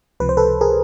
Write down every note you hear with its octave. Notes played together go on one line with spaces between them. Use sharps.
C#2 C3 F3 B4
C5
A4 B4
G#4 A#4